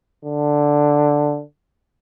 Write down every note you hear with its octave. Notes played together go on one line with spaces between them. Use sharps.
D3